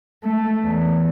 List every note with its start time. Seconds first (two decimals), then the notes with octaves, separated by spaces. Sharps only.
0.24 A3
0.63 E2